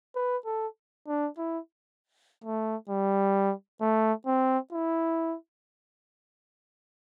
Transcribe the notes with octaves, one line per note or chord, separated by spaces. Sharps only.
B4
A4
D4
E4
A3
G3
A3
C4
E4